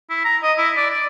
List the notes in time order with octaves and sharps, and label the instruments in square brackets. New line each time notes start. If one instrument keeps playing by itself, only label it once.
[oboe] E4
A#5
D#5
E4
D5
D5